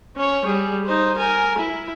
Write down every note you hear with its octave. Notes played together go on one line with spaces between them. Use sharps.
C#4 C#5
G3 G#4
D#4 C5
A#4 G#5
E4